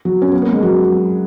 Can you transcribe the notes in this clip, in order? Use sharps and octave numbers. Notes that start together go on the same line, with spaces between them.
F#3
C#4
B3
A#3
G#3
F#3